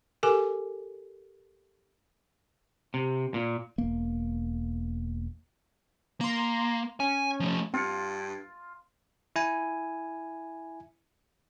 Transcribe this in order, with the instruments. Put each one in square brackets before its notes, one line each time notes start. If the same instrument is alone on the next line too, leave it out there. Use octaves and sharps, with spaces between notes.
[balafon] G4 A4 A#4 G#5 D6
[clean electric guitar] C3
A#2
[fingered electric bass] E1 A#3
[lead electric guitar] A#3 [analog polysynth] A#5 C6
[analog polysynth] C#4 [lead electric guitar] G#5
[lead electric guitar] F3 A3
[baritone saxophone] G2 [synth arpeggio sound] C4 C#7 [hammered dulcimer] F4
[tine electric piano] E4 G#5